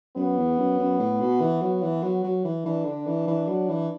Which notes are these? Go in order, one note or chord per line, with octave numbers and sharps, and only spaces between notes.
F#2 B3
E2
F#2
F#2
A2
B2
E3
F#3
E3
F#3
F#3
E3
E3 D4
D3
E3
E3
F#3
E3